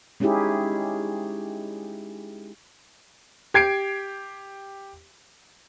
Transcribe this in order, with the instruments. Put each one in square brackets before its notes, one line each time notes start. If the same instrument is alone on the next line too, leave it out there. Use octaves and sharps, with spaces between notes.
[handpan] G#3 C#4 D#4 E4 G4 G#4
[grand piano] G4 G#6 C7 D7